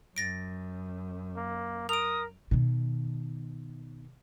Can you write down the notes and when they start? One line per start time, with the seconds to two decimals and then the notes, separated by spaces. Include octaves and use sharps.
0.16 F#2 A6 A#6 D7
1.36 A#3
1.89 A#4 D#6 D7 F7
2.51 B2 D#3